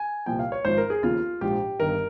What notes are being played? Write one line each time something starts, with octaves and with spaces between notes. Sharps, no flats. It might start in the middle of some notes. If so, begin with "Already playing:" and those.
Already playing: G#5
C2 A#2 F3 G5
F5
C#5
G#1 G#2 F3 C5
A#4
G#4
D#2 C#3 F3 F4
A#1 G#2 F3 G4
G1 G2 D#3 A#4